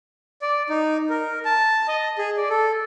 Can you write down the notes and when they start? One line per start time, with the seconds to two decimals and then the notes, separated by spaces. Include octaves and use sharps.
0.42 D5
0.69 D#4
1.10 A#4
1.45 A5
1.88 D#5
2.18 G#4
2.37 D5
2.50 A4